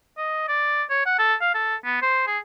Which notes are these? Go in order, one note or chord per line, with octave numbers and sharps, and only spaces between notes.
D#5
D5
C#5
F#5
A4
F5
A4
B3
C5
G#4